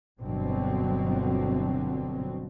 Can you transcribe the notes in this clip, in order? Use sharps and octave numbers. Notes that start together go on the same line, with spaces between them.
G1 B2 D3 F#3 C4